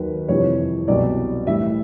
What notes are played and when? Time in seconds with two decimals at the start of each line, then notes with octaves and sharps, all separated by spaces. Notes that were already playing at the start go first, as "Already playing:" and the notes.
Already playing: D#2 D#3 F#3 B4
0.29 F2 C3 E3 G3 C#5
0.88 C2 B2 F#3 D5
1.47 A2 E3 G3 E5